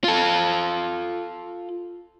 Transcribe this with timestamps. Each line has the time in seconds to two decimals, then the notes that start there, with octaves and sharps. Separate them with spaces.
0.04 F4 A4